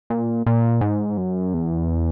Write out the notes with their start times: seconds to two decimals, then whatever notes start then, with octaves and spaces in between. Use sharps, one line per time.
0.10 A#2
0.46 A#2
0.81 G#2
1.17 F#2
1.54 E2